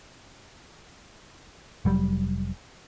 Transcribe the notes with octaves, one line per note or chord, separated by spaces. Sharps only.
F1 F#3 G3